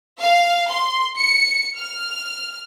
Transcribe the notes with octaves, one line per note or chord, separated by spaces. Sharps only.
F5
C6
C#7
F6